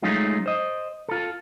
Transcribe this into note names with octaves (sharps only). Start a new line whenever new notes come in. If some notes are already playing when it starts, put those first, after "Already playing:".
F#3 G#3 A3 C#4 D#4 F4
C5 D#5
F4 A4